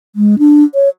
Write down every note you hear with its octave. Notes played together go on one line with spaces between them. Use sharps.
G#3
D4
C#5